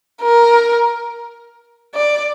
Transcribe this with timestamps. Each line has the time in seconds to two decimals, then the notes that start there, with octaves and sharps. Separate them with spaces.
0.22 A#4
1.95 D5